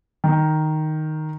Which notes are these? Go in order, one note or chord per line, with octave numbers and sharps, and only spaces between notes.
D#3